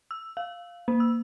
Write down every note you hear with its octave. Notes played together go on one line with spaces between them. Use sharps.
E6
F5
A#3
E6